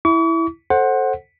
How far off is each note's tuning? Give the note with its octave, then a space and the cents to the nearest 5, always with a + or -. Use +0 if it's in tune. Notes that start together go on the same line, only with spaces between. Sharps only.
E4 +0 C#6 +45
A4 +0 C5 +20 F#5 +0